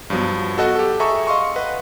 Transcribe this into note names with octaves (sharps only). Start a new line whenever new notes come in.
G2 F3 F#3 B3
F#4 A4 D#5 F#5
G4 A4
G#4 A4 E5 G#5 A#5 C#6
D#5 F5 C6 C#6
B4 D#5 F#5